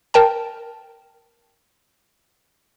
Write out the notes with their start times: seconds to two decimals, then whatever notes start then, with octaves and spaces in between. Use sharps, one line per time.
0.14 A#4 G5 A5